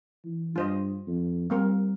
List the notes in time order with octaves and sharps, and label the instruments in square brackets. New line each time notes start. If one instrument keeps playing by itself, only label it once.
[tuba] E3
[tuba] G2 [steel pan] F4 C5 D#5
[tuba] F2
[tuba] G3 [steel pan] A#3 C4 A#4